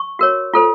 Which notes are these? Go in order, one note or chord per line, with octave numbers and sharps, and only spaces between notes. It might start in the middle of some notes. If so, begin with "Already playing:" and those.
Already playing: C#6
F#4 A#4 C#5
F4 A4 C5